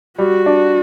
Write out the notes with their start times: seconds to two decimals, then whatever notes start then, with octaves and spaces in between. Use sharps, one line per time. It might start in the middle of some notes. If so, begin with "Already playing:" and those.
0.18 G3 F#4
0.46 D4